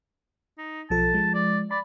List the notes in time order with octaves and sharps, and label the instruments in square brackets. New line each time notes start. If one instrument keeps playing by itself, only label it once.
[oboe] D#4
[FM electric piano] B1 F3 A4 [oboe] A5
[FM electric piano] F3 G#3
[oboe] D5
[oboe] D5 [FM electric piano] B5